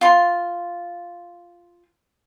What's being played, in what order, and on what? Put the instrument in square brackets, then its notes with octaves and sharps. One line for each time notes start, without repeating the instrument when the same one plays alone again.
[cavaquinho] F4 C6